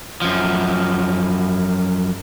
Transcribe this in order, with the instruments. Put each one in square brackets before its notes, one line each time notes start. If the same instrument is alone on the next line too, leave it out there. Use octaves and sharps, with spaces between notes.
[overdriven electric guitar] F#2 F3